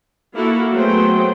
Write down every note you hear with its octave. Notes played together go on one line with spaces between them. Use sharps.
A#3 E4 F#4 A4
F#3 A3 B3 G#4 C5 G5